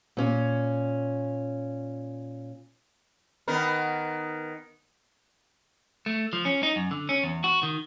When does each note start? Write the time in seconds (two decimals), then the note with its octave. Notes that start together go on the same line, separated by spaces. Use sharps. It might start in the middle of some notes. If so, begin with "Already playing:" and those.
0.17 A#2 C#4
3.48 D#3 B3 A#4
6.06 A3
6.33 F3
6.45 C#4
6.63 D#4
6.76 F#2
6.91 D3
7.09 C#4
7.24 E2
7.44 F#4
7.63 D#3